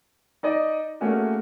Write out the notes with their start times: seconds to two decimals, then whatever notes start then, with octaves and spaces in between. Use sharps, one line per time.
0.43 D#4 D5 D#5
1.01 A3 A#3 C#4 F#4 G#4